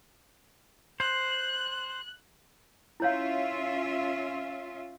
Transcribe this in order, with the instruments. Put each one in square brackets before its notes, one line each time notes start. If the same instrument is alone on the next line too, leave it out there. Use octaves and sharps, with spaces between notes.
[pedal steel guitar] C5 [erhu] F#6
[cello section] C#4 F4 E5 [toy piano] E4 C#5 F5